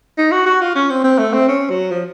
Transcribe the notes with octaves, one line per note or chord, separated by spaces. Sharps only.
D#4
F#4
F#4
F4
C#4
C4
C4
A3
C4
C#4
F#3
F3